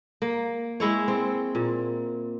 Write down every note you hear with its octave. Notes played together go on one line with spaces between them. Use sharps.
A#3
G#3 E4 C#5
C4
A#2